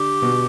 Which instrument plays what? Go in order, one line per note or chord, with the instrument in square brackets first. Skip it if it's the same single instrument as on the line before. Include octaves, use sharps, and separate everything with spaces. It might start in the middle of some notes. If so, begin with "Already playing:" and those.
Already playing: [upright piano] D3 [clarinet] G4
[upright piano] B2